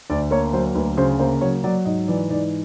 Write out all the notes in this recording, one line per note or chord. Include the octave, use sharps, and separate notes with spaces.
D2 D5
A#3 C#5
F#3 C5
D2 B4
C#3 C5
A#3 C5
F#3 C#5
F#3 D5
G#2 D#5
E3 D5
G#2 D5